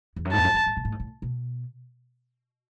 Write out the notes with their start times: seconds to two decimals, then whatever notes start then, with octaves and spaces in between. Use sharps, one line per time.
0.16 E2
0.25 F#2
0.32 G#2 A5
0.38 E2
0.44 F#2
0.54 E2
0.66 G#2
0.77 B2
0.85 A2
0.92 G#2
1.00 A2
1.22 B2